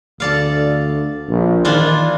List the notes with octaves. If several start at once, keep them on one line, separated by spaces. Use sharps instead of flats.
D2 A4 D5 F5
A#1
D#3 E3 D4 F4